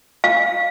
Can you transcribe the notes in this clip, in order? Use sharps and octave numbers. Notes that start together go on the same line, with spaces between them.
F5